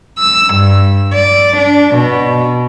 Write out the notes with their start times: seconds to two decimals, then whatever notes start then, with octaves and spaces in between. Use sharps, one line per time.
0.19 E6
0.54 G2
1.14 D5
1.57 D4
1.95 B2